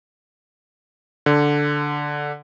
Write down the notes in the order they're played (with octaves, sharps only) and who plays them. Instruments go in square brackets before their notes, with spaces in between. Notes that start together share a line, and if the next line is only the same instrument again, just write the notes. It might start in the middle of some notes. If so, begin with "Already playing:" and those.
[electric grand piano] D3